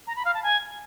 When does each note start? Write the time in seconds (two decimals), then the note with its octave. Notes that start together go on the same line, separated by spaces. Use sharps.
0.07 A#5
0.16 B5
0.25 F5
0.34 A5
0.43 G#5